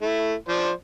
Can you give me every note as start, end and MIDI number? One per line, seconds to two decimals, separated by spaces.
0.02 0.34 57
0.02 0.34 64
0.48 0.71 53
0.48 0.71 72
0.48 0.71 74